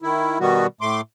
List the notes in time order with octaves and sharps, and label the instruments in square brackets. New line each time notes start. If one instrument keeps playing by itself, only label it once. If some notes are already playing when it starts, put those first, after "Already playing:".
[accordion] D#3 E4
B2 D#3 G3 B3 F#4
A2 A3 C6 D6